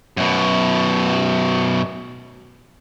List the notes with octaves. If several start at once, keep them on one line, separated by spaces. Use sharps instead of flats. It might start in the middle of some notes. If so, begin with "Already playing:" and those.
F#2 B2